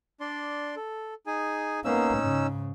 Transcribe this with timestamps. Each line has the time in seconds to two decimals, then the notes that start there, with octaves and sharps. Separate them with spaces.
0.20 D4 D5 C6
0.76 A4
1.26 D#4 G#4 G#5
1.85 A#3 B3 C#4 D#4 E6
2.19 G#2 C#3